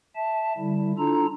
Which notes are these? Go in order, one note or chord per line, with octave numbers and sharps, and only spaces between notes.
E5 A5
D3 G3 E4
D4 E4 F4 A4 A#5